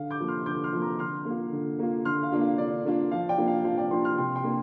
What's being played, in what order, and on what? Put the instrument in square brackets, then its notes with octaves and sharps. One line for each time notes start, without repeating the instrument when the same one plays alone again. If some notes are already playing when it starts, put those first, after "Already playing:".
Already playing: [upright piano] D3 F5
D6 G6
F3 A#3
C6 F6
D3 D6 G6
C6 F6
F3 A#3
A#5 D6
D3 C6 F6
A#3 F4
D3
A#3 F4
D3 C6 F6
F5
A#3 D4 F4
F5
D3 D5
A#3 D4 F4
F3 F5
D5 G5
A#3 D4 F4
F5
F3 F5
D5 G5
A#3 D4 F4 G5 C6
C6 F6
C3 G5 C6
G5 C6
A#3 D4